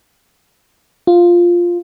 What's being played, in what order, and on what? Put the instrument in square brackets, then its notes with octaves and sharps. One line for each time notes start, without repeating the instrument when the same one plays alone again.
[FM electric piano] F4